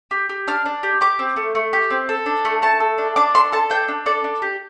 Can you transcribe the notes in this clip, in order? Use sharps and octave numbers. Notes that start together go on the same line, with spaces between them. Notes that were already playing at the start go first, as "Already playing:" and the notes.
G4
G4
D4 F6
D4
G4
G4 D6
C4
A3
A3
G4
C4
A4
D4
A3
A3 A5
A4
D4
D4 D6
A4 C6
A4 A5
D4 G5
D4
A4 D5
D4
G4